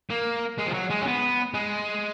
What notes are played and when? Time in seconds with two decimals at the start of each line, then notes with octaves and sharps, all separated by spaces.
0.10 A#3
0.59 G#3
0.67 F3
0.74 F#3
0.90 G#3
1.02 C#4
1.07 B3
1.54 G#3